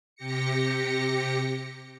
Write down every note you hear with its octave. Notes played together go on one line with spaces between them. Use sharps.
C3 G4 A#6 C#7